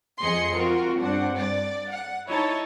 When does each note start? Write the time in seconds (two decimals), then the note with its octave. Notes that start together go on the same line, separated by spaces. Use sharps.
0.21 F2 G#4 D#5 C6 C#7
0.55 C4 F4 F#4 A#4
1.01 G2 C4 D4 F#5
1.38 D5
1.91 F#5
2.29 D#4 E4 C#5 A5